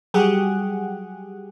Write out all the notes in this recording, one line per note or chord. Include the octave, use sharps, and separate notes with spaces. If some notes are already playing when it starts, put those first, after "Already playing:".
F#3 G3 G4 G#4 F#5